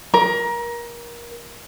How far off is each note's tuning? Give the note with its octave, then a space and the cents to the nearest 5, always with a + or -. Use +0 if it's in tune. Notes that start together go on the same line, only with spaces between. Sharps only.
A#4 +25